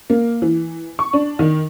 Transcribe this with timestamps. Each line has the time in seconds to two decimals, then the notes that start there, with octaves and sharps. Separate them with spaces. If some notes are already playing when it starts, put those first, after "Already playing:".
0.10 A#3
0.42 E3
0.99 C#6
1.13 D4
1.39 D#3